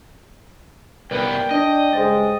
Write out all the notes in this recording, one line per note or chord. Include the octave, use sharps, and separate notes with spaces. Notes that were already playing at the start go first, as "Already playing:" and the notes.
C2 B3 A#4 B4 D5 G5
D4 D5 D#5
G2 C#3 G#3 G#4 C5 A6